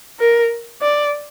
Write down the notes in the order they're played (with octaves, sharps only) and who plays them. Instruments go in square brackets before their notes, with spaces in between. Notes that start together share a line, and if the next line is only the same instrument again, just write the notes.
[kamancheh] A#4
D5